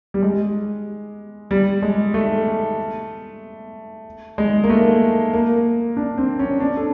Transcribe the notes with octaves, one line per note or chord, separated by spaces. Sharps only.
G3
G#3
G3
G#3
A3
G#3
A#3
A3
A#3
D4
C4
C#4
D4
A4